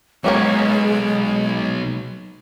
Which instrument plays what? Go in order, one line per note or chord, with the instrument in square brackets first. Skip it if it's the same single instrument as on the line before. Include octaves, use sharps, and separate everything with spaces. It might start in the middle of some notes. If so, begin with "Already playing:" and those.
[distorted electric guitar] B1 [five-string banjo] F#3 A#3 C#4 [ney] G#3